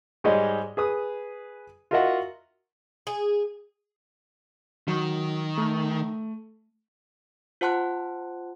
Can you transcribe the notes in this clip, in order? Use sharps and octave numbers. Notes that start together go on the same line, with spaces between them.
G#2 G3 G#3 C#5 D#5
G#4 B4 D#6
F4 F#4 A#4 D#5 E5 F#5
G#4
D#3 F#3
A3
F4 C5 F#5 A5 C6 F#6